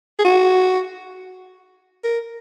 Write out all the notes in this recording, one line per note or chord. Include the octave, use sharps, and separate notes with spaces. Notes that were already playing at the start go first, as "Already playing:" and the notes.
G#4
F#4
A#4